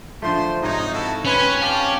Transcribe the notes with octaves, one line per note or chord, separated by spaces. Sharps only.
D3 F3 A3 C5 C6
G#2 C3 D#4 C#5
E4 F#4 A4 F5
C4 C#4 B4 C#5
G4 F5 A5